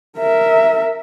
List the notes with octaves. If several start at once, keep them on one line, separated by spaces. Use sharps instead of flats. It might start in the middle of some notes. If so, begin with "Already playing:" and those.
A#4 E5